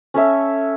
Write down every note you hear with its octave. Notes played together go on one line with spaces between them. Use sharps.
C#4 A4 C#5 E5